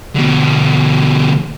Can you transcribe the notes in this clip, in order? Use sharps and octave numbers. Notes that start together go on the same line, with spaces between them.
B2 D3